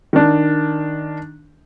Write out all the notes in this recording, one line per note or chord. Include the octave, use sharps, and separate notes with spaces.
D#3 D4